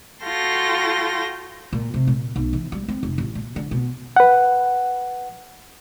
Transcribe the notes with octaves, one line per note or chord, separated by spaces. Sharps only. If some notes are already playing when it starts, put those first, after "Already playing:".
F4 F#4 A4 G5 C6 A#6
A#2
C3
A#2
B1
E3
G3
C4
F1
A1
A#2
D3
B2
B4 F#5